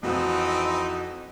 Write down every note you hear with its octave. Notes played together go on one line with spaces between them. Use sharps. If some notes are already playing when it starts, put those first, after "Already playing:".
F2 E3 C4 D#4 F#4